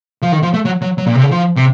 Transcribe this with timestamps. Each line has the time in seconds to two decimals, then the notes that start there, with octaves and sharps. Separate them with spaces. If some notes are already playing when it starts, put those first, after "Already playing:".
0.22 F3
0.32 D#3
0.43 F3
0.54 A3
0.65 F#3
0.82 F#3
0.98 F#3
1.07 A#2
1.15 C3
1.23 C#3
1.31 F3
1.56 C3